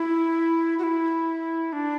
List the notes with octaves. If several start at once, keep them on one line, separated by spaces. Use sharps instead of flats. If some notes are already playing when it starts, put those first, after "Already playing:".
Already playing: E4
F#4
E4
D4